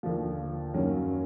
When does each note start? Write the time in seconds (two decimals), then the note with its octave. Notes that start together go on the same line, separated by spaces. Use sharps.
0.03 D#2 D3 F3
0.74 F#2 D#3 F#3 A#3 C#4